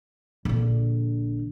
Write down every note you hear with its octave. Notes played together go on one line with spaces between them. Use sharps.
A#1 D3